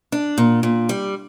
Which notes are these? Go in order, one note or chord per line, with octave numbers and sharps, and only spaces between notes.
D4
A#2
A#2
G3